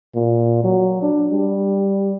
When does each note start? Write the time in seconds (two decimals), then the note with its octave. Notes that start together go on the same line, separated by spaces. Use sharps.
0.15 A#2
0.64 F#3
1.02 D4
1.32 G3